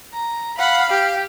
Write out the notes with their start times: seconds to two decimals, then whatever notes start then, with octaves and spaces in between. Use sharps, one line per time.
0.13 A#5
0.58 F5 F#5 B5
0.90 G4